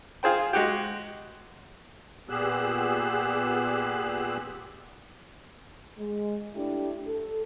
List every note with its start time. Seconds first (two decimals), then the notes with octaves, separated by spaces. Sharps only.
0.23 F4 G#4 C5 G5
0.53 G#3 F#4 G4
2.29 A#2 B3 G4 G#4 E6 F#6
5.98 G#3
6.54 A3 D4 E4 G4
7.07 A4